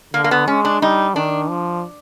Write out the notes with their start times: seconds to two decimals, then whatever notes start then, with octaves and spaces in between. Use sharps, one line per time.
0.14 D3 A#3
0.24 A#3
0.31 B3
0.48 G#3 C#4
0.65 D4
0.82 G3 D#4
1.15 D#3 D4
1.50 F3